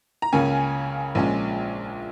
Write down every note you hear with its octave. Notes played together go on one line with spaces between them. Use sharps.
A#5
C#2 C#3 A#3 C#4 G#5
A#1 A#2 G#3 C#4